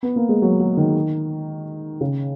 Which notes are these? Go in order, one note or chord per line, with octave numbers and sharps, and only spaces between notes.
B3
A#3
G#3
F#3
F#3
D#3
C#3